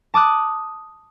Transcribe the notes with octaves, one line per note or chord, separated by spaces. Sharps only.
A5 D6 D#6 F#6